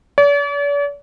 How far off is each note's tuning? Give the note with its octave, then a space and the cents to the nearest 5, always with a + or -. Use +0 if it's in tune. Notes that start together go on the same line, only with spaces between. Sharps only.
D5 -45